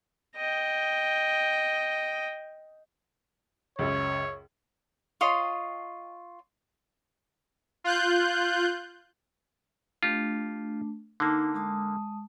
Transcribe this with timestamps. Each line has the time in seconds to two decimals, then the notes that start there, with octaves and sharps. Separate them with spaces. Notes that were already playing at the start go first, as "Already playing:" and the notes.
0.36 D#5 G5
3.79 C#2 F#2 C#5
5.21 F4 C#5 D#5 C6
7.84 F4 F#6 G6
10.03 A3 D4 F4 G4
11.20 D3 A#3 D#4 A5
11.54 G#3 A5 D#6